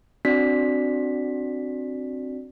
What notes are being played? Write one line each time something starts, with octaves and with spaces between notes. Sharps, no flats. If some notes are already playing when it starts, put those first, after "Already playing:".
C4 D4 F#4 D5 B6